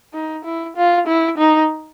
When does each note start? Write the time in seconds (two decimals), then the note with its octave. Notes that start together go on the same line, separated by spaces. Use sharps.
0.14 D#4
0.44 E4
0.76 F4
1.07 E4
1.37 D#4